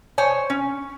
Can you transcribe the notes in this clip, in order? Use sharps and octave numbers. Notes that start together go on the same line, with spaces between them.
C5 C#5 G#5
C#4